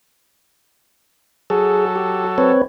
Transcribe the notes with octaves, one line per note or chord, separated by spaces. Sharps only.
F#3 G#4 A4
G4
C4 B4 C#5